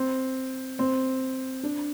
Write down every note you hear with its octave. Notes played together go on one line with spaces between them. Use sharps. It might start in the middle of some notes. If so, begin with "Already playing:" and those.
Already playing: C4
C4
D4